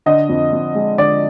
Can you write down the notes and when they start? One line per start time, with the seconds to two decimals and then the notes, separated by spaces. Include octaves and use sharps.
0.06 D3 D#5
0.29 F2
0.53 F2
0.75 G#3
0.98 D3 D5